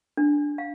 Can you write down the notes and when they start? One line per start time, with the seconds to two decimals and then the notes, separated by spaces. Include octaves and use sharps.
0.17 D4
0.58 F5